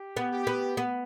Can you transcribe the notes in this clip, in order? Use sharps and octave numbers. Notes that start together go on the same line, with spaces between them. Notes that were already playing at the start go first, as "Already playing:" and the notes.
Already playing: G4
B3
G4
B3
B3